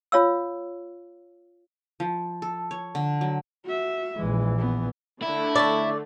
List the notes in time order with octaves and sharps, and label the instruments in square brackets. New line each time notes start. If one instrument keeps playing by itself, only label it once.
[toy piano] F4 C#5 F5 E6
[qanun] F3
A4
C#5
D3
F#3
[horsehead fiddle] F#4 E5
[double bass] A#1 E3 [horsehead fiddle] G#3
[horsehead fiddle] B3
[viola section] D3 A3 [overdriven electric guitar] E4
[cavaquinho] A4 C#5 E5 [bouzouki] D5